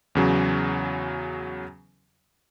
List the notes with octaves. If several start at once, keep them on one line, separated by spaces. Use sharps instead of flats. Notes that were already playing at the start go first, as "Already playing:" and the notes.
E2 C#3 F#3